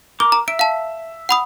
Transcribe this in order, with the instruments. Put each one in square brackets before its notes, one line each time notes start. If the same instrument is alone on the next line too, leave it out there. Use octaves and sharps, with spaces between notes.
[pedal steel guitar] A#4 D6 [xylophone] G7
[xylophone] A#5
[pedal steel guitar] E5 [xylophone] D7
[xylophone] F5 A5
F#5 B5 D#6